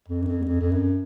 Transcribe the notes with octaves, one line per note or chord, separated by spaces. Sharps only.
F2
F#2
F2
E2
F2
F2
F#2